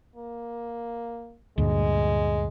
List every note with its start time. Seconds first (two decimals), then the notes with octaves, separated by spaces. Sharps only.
0.16 A#3
1.58 D2 G2 A#2 G#3